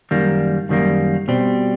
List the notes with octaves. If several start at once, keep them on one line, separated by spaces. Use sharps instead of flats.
F#2 D#3 G3 A#3
F#2 D#3 G3 A#3
B2 G3 C4